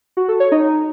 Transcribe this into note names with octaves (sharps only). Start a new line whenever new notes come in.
F#4
A4
C#5
D#4